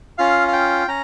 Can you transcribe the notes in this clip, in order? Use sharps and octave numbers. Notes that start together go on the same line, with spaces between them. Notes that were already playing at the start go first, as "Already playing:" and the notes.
C#4 F4 F5
F5
G5
C#4 A#5